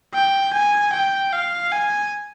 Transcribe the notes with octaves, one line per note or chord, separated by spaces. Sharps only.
G5
G#5
G5
F5
G#5